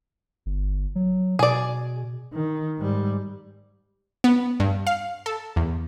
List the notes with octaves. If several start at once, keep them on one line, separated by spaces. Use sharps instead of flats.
G1
F#3
B2 G#4 D5
D#3
G#2 G3
B3
G2
F5
A4
E2